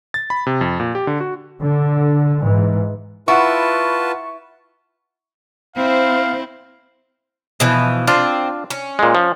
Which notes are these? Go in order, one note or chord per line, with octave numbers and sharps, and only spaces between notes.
A6
B5
C3
F2
A#2
G4
D3
F#4
D3
G#2 E3
E4 F4 B4 F#5 A5 C#6
C4 E4 C5 F5
B2 E3 F3
C4 D4 F4
C#4
A#2 G#3
F3